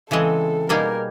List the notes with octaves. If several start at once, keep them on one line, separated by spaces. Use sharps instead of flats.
C#3 E3 G#3 C4 A4
B2 G3 A#3 D#4 G#4 A#4